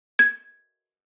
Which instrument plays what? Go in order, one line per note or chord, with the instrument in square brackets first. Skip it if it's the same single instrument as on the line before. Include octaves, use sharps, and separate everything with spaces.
[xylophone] G#6